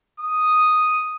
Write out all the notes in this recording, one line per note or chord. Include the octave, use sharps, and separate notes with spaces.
D#6